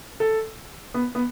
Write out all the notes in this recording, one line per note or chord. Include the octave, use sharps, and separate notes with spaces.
A4
B3
B3